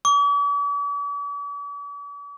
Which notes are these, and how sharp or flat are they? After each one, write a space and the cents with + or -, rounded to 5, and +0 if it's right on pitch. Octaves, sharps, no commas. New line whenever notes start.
D6 -45